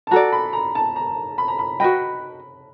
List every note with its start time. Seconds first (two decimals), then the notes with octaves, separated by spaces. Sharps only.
0.07 A5
0.11 F#4 A4 D5 A#5
0.32 B5
0.53 A#5
0.75 A5
0.96 A#5
1.38 B5
1.48 A#5
1.59 B5
1.80 F#4 B4 D#5 G5 B5